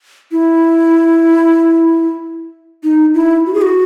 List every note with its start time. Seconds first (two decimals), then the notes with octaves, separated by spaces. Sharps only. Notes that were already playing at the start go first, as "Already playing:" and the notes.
0.32 E4
2.83 D#4
3.14 E4
3.46 F#4
3.54 G#4
3.62 F#4